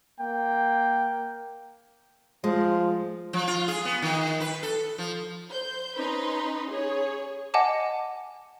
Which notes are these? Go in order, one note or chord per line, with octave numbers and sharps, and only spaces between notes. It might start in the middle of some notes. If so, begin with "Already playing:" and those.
A#3 G5
F3 G#3
F3
F4
G#4
B3
D#3
B4
A4
F3
C5 G6
C#4 D#4 B4 A#5 C6
G#4 C#5
D#5 F#5 G#5 A5 D6